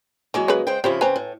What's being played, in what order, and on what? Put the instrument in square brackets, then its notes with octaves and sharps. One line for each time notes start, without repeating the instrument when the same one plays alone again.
[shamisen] E3 [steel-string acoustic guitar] F#3 G#3 A#3
[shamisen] C#3 B4
[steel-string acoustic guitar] G#3 C5 G5
[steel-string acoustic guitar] C#3 F3 E4 [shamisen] C4 G4
[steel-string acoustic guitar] C#3 C4 [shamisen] B4 G#5 A#5
[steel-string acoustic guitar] A2